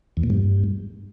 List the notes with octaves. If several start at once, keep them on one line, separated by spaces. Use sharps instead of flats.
E2
A#2
G2